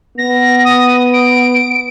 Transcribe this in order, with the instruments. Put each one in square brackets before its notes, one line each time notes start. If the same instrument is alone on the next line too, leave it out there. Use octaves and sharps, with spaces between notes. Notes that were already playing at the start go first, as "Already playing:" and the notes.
[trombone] B3 [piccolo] A#6
[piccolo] D#6
D7